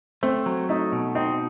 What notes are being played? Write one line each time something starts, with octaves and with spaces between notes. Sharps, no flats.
A3 C4
F#3
A3 D#4
B2
C4 D#4